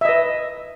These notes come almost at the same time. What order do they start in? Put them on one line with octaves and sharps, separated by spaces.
E5 D#5 B4